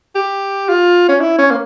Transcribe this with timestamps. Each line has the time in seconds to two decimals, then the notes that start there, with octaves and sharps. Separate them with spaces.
0.15 G4
0.69 F4
1.09 C#4
1.20 E4
1.38 C#4
1.51 A#3